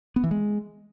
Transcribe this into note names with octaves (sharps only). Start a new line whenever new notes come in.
B3
E3
G#3